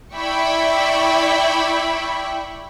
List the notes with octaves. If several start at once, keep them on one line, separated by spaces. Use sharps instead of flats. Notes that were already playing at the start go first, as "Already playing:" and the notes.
E4 D5 E5 G5 B5 C#6